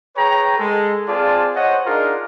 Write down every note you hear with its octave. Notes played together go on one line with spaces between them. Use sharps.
G#4 B4 C#5 G5 A#5
G#3 A4
C4 F4 G#4 D5 A5
C5 C#5 D#5 F#5
D4 D#4 F4 G#4 A#4